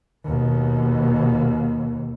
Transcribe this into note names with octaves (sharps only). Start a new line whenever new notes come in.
D#2 B2